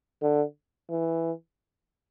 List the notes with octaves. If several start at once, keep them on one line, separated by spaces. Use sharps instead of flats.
D3
E3